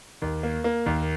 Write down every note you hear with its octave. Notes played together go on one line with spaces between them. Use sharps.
D#2
A#3
A#3
D#2